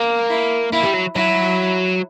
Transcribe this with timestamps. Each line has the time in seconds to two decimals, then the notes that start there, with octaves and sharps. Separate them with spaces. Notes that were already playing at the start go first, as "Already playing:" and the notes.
Already playing: A#3
0.30 E4
0.73 A#3 E4
0.83 G3
0.94 F#3
1.15 F#3 E4